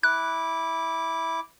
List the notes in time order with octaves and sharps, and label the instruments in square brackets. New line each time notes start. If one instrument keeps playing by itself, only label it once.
[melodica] E4 D6 [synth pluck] F#6